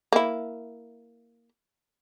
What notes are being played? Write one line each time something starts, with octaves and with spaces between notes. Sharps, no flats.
A#3 E4